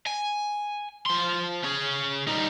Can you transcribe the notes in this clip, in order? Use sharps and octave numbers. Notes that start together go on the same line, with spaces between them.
G#5
F3 C6
C#4 G#4
G3 D#4